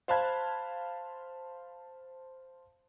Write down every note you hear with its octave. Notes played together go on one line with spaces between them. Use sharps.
C5 F5 A5 B5 F#6 G#6